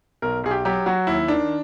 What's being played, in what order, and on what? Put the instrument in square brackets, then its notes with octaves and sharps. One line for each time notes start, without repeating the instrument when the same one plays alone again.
[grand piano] B1 A#4
B1 G#4
G4
F#3 G4
F#3 F#4
D#2 E4
D#3 D4